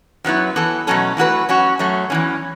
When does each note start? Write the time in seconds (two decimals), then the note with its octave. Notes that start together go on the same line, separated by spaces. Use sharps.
0.24 F#2 F#3 B3 E4
0.56 E3 B3 A4
0.87 B2 F#3 A3 C#4 A4
1.17 E3 A3 F#4 B4
1.49 F#3 C#4 F#4
1.79 F#2 F#3 A3 C#4
2.10 E2 E3 C#4